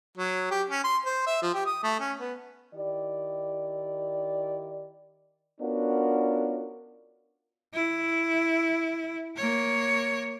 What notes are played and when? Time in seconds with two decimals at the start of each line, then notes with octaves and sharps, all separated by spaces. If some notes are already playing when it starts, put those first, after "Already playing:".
0.17 F#3
0.51 G4
0.70 C#4
0.84 C6
1.06 C5
1.26 E5
1.42 F3
1.54 G4
1.66 D#6
1.83 A3
2.00 C#4
2.19 B3
2.73 D#3 E4 G4 D5
5.61 B3 C#4 D4 F4 F#4 A#4
7.74 E4
9.37 A#3 C#5